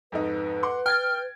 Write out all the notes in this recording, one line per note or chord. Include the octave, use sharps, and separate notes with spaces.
F2 G#2 D#4 B4
F#5 C6 D6
G5 F6 G#6 A6